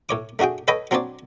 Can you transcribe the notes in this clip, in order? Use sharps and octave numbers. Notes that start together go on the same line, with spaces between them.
A2 C#5 D6
A3 D4 F#4 G#4 G5
A4 B4 C#5 D#5 G5 B5
F#3 C4 D4 C#5 D5